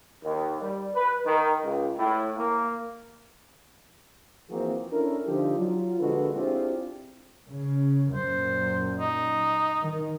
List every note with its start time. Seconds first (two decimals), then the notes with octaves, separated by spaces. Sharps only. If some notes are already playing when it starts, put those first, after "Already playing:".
0.23 D#2
0.62 G3
0.95 B4
1.25 D#3
1.63 C#2
1.98 A2
2.37 A#3
4.50 E3 F3 A#3 C4 F#4 G#4
4.91 C#4 D4 E4 A4 A#4
5.26 D3 F3 D4 D#4 G4
5.57 F#3 F4
5.98 A#1 D3 G#3 F#4 A4 B4
6.35 C4 D4 E4 F4 G4 G#4
7.51 C#3
8.15 F#2 A#2 C5
9.00 D#4
9.83 D#3